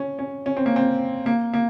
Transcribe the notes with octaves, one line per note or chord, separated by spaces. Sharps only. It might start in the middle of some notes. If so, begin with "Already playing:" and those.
Already playing: C#4
C#4
C#4
C4
A#3
C4
A#3
A#3